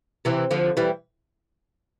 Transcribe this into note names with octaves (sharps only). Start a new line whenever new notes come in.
C3 E3
D3 F3
E3 G3